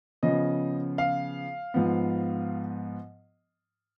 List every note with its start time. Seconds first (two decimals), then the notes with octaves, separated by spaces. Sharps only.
0.23 C#3 F3 B3 D#5
0.98 F5
1.74 G#2 F3 B3